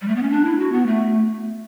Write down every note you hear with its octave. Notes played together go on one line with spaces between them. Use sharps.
G3
A3
B3
C#4
D4
E4
F#4
B3
A3